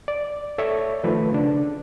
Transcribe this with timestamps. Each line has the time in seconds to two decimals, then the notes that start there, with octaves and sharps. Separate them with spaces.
0.08 D5
0.58 A4 C#5 D5 E5
1.04 D#3 F3 A3 B4
1.32 C#3 D4